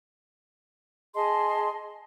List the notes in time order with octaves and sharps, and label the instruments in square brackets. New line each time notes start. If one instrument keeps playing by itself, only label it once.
[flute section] G#4 D#5 A5 C6